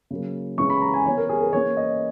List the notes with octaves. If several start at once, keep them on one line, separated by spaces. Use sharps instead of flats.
C#3 F#3 A#3
C#3 E3 G#3 C#4 C#6
B5
A#5
G#5
E3 B3 C#5
A#4
G#4
A#4
E3 A#3 C#4 C#5
D#5